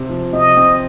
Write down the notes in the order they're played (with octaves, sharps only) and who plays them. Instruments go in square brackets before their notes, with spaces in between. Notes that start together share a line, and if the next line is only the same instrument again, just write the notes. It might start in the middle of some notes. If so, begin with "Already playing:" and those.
Already playing: [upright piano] C3 C4
F3
[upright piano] C3 [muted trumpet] D#5
[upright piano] C4